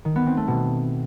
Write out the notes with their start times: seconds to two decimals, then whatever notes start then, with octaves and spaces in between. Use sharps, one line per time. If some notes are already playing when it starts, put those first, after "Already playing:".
0.05 D#3
0.16 B3
0.26 C4
0.37 A3
0.48 B2